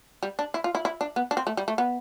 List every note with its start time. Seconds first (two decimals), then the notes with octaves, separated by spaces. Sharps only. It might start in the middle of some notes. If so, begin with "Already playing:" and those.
0.23 G3
0.39 D4
0.54 E4
0.64 F4
0.75 E4
0.85 E4
1.01 D4
1.16 B3
1.31 D4
1.37 C4
1.47 A3
1.57 G3
1.68 A3
1.78 B3